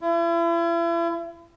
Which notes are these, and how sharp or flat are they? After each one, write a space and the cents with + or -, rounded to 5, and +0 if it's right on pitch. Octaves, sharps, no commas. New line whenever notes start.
E4 +40